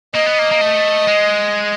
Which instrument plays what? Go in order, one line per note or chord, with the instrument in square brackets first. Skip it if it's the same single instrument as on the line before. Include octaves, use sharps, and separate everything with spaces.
[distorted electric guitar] A#3 [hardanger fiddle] D#5
[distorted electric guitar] B3
A#3
A#3
A3
G#3